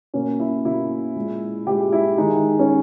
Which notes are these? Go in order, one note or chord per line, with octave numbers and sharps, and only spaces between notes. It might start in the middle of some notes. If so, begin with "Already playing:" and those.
B2 A#3 C#4
E4
B2 A#3 E4
A#2 G#3
A#2 G#3 G4
E4
D#3 G#3 D#4
C#4